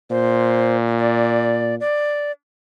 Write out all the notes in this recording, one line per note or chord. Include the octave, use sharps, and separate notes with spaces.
A#2 C5
D5
D5